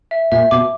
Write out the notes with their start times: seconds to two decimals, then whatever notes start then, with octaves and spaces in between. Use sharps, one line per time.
0.11 E5
0.32 A#2 E5
0.51 B2 D6